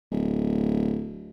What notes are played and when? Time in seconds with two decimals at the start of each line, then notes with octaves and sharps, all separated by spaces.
0.12 D1